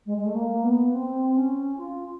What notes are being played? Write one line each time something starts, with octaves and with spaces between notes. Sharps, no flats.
G#3
G#3
A3
A#3
B3
C4
C#4
F4